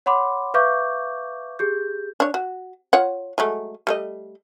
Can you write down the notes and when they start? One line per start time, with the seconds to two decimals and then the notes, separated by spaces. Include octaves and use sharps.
0.06 C#5 F#5 B5 C6 D6
0.54 B4 E5 F5 C#6 D6 G6
1.59 G4 G#4 G6
2.20 D4 C#5
2.34 F#4
2.93 F4 C#5 F#5
3.38 F#3 G#3 A3
3.87 G3 A3 D#5